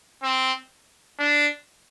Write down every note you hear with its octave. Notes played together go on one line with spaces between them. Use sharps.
C4
D4